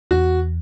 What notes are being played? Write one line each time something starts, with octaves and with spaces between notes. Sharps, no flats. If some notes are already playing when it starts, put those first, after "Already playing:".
E2 F#4